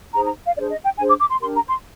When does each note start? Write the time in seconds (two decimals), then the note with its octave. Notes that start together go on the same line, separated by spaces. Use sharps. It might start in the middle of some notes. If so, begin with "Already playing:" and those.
0.14 D#4 G#4 C5 A#5
0.25 A#5
0.47 F5
0.56 D4 G#4 C5 D5
0.71 D#5
0.84 G5
0.98 D4 G#4 C5 G#5
1.09 D6
1.20 D6
1.30 C6
1.41 D4 G4 A#4 C6
1.55 A#5
1.68 C6